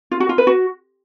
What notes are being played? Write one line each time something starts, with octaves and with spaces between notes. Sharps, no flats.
F4
F#4
F4
B4
F#4